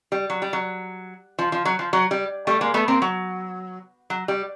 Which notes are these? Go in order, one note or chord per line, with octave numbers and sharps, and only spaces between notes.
G3
F#3
G3
F#3
F3
F3
F#3
F3
F#3
G3
G3 A3
G#3 A#3
A3 B3
A#3 C4
F#3
F#3
G3